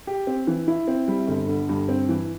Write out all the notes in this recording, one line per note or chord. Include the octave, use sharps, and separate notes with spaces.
G4
C4
E3
E4
C4
G3
G1
D3
G2
C4
E3